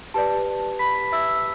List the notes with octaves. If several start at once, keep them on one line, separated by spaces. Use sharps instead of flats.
G4 B4 D5 A5
B5 B6
E5 E6